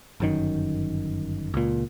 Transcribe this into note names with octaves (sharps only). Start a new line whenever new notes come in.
G1 F#2 D#3
C#2 A#2